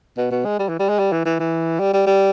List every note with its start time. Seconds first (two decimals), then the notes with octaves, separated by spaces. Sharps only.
0.17 B2
0.31 B2
0.45 G#3
0.59 G3
0.69 E3
0.79 G3
0.89 G#3
0.99 G3
1.12 E3
1.26 E3
1.40 E3
1.80 G3
1.93 G3
2.07 G3